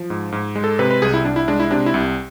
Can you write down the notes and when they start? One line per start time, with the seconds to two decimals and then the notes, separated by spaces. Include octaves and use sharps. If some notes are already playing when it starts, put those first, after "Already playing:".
Already playing: F3
0.10 G#2
0.32 G#2
0.56 G#3
0.64 A4
0.79 C3 B4
0.91 B4
1.02 C2 G#4
1.14 E4
1.25 C2 D4
1.36 E4
1.48 G#3 D4
1.60 E4
1.71 C3 D4
1.86 E4
1.94 C2